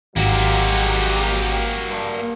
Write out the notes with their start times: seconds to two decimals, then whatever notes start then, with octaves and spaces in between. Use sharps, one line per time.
0.16 G#1 F#3 G#3 A#3 F#4 G4
1.87 G2